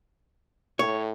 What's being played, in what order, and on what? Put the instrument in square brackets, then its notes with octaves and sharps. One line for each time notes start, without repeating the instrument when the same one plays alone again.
[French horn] A2 [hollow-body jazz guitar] C#5